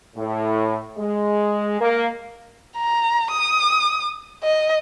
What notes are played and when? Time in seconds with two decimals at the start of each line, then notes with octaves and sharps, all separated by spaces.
0.16 A2
0.97 G#3
1.80 A#3
2.78 A#5
3.31 D#6
4.43 D#5